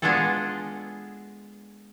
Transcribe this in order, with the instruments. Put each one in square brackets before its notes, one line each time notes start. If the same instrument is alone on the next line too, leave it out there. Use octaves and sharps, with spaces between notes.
[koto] G#3 B3 D4 F4 G#4 A4